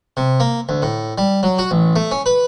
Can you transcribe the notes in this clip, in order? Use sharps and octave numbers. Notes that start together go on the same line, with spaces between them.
C3
A#3
D2
A2
G3
F#3
F#4
A1
A3
C#4
B4